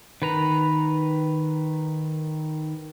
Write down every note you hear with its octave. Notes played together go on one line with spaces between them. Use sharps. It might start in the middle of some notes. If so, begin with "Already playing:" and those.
D#3 B4 A#5